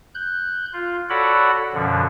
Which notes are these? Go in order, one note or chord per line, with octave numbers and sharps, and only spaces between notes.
F#6 G6
F4
F#4 A4 C#5 D5 F#5 B5
F#2 B2 D3 F3